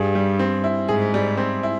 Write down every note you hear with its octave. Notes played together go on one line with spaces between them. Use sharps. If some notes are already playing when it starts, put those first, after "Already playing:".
Already playing: G2 G#4
G3
C4
E4
G#2 G#4
G3
C4
E4